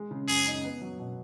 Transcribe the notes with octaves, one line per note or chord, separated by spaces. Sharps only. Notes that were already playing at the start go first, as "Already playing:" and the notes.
Already playing: G#3
C#3
F#2 G#4
D#4
B3
F#3
B2